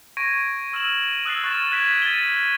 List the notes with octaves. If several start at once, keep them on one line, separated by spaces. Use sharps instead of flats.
C#6 G#6 A#6 D7 D#7
C#6 E6 F6 D#7 E7 F#7
D#6 E6 F#6 G#6 A6 C7
C#6 F6 A6 E7
F#6 G#6 B6 D7 D#7
A6 B6 D#7 G7